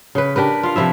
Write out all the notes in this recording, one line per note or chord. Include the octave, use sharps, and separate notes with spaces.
C#3 B4
D4 G4 A#4 B4
F4 F5
C3 F3 E4 E5